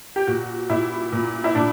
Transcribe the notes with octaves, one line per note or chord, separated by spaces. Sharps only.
G4
A#2 F#4
A#2 E4
A#2
E4
A#2 D4